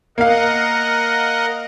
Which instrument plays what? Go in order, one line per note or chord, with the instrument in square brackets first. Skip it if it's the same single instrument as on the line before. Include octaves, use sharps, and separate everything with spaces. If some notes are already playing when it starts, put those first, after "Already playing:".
[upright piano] A#3 F5 [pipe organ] A#4 D#5 F#5